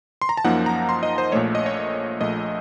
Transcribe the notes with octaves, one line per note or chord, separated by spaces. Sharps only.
C6
A#5
A5
F#2 F3 A#3 D#4 F#5
A#5
C6
D#5
C5
A#1 A#2 A3 C#5
D#5
C#5
A#1 A#2 A3 D#5